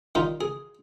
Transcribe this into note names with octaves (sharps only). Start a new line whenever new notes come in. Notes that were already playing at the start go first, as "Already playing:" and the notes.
D#3 G3 D#4 F4
G#4